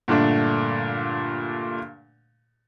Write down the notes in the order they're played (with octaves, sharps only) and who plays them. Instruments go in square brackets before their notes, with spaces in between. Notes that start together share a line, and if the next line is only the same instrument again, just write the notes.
[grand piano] G2 A#2 D3 A3 D4